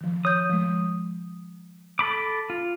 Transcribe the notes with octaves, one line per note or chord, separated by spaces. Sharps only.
D#3 F3
C#5 D#6 G6
F3 G#3
A4 B5 D6
F4